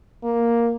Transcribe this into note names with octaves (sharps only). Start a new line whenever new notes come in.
A#3